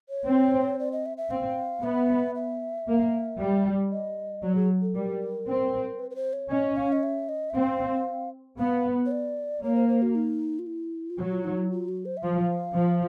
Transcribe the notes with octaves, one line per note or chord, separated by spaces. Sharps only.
C#5
C4
D5
D#5
E5
E5
C4 F5
B3 E5
E5
A#3
G3
D#5
F#3 D5
G#4
A4
G3 A#4
C4
B4
B4
C5
C#5
C#4 D#5
F5
D#5
E5
D#5
E5
C4 F5
B3 F5
C#5
D5
A#3 C#5
C5
C5
F#4
D#4
F4
E4
F4
F#3 F#4
F4
D#4
E4
F4
F#4
C5
E5
F3 F5
F3